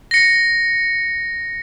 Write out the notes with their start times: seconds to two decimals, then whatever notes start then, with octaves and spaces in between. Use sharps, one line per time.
0.11 A#6 C#7